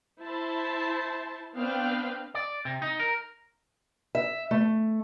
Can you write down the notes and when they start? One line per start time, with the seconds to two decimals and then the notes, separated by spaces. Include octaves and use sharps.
0.20 E4 C5 A5
1.56 B3 C4 D4 B4 F5 G5
2.34 D5
2.65 C3
2.82 D#4
3.00 A#4
4.15 E5
4.51 A3